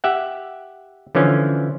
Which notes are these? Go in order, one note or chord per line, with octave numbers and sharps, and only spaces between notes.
G4 E5 F#5
D3 E3 F3 C#4